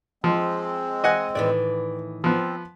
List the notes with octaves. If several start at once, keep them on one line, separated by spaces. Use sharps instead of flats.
F3 G#3 C4
D#5 F#5 G#5
A2 D#3 E3 D5
F3 B3 C4